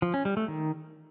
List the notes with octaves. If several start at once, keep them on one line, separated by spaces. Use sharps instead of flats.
F3
C#4
G3
A3
D#3